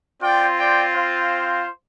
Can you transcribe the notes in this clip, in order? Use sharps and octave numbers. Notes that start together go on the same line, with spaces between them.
C4 F4 D5 G5
D5 G5
C5 F5